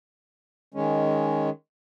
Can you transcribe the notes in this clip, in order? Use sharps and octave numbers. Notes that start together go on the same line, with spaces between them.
D#3 G#3 C#4